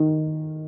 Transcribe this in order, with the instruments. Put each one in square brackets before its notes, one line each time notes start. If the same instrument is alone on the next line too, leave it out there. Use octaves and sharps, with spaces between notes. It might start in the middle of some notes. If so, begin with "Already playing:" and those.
Already playing: [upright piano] D#3